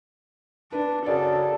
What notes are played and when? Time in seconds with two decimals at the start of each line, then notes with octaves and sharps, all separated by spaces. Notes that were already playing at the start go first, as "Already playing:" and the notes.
0.72 D4 B4
1.06 F#2 C#3 A4 D5